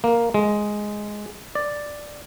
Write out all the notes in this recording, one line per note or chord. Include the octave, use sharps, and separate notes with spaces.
A#3
G#3
D5